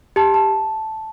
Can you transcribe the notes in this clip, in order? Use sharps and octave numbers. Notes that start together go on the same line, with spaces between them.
G4 A5
A5